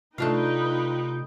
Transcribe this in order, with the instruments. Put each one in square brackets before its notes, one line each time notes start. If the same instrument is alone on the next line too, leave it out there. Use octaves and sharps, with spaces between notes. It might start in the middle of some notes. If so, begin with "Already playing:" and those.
[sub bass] C3 [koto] A3 D4 F5 [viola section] D#4 B4 G5 [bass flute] F4